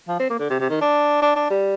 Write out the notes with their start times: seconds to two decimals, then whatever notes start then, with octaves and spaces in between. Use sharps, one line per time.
0.08 F3
0.20 C4
0.30 A#3
0.39 D3
0.50 C3
0.60 C3
0.70 D#3
0.82 D4
1.22 D4
1.36 D4
1.50 G3